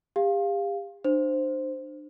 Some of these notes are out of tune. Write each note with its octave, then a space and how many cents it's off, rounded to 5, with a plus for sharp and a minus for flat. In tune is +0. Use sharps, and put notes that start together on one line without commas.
G4 +35 F5 +0
D4 +35 C5 +0